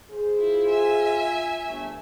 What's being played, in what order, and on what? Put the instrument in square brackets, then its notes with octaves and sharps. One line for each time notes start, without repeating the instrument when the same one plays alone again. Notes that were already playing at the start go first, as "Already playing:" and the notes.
[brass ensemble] G#4 C5
[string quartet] E4 [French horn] F4
[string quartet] E5 G#5
[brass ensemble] G1 A3